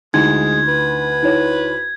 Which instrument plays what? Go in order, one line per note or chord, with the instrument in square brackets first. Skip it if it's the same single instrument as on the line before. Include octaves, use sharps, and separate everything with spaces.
[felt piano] D2 [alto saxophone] G#3 [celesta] D#4 E4 [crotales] G#6
[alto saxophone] B4
[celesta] D#4 E4 C#5